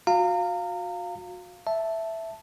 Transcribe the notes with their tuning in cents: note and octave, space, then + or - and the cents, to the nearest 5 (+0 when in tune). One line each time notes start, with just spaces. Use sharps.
F#4 -30 F5 +0 A#5 -30
E5 +0 A5 +0